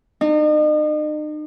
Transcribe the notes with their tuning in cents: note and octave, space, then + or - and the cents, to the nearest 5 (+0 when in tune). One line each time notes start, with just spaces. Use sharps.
D#4 -40